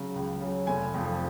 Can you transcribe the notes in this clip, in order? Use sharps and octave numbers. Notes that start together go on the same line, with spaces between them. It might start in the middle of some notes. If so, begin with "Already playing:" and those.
Already playing: C#3 F#3
C#2
C#3 F#3
F1 G#5
F2 F3